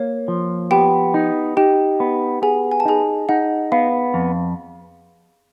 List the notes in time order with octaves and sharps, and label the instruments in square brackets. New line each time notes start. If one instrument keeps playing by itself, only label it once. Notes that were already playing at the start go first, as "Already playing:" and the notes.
Already playing: [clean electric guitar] A#3 [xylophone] C#5
[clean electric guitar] F3
[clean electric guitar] B3 [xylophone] G4 G5
[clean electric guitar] D#4
[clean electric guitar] D#4 [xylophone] G4 G5
[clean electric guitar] B3
[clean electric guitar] B3 [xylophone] G#4 G#5
[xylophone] G#5
A5
[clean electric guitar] D#4 [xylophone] G#4 G#5
[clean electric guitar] D#4 [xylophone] F#5
[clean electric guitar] B3 [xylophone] F5
[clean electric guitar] F2